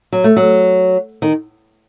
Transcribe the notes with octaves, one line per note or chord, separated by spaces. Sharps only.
F#3
A3
F#3
D#3